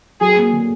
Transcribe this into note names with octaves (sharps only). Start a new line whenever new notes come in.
F#3 G#4
A#3
D3